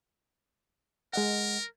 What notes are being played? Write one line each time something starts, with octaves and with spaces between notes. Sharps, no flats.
G#3 A#4 D#5 F#5